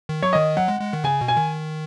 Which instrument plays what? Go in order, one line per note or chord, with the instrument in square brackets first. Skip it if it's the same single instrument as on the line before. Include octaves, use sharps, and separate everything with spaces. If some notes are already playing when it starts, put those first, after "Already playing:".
[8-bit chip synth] D#3
[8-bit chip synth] F#3 [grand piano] C#5
[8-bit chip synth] D#3 [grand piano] D#5
[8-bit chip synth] F#3 [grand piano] F#5
[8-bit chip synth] G#3
G#3
D#3
[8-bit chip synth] C#3 [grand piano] G#5
[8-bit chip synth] B2
[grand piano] G#5
[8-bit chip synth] D#3